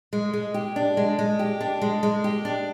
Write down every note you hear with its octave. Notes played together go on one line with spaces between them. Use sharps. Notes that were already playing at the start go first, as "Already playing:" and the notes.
G#3
G#3
G4
D4
G#3
G#3
G4
D4
G#3
G#3
G4
D4